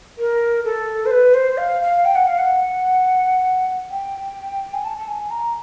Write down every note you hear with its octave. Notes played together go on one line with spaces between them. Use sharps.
A#4
A4
C5
B4
C5
F5
F5
G5
F#5
F5
F#5
G5
G#5
A5
A5
G#5
A#5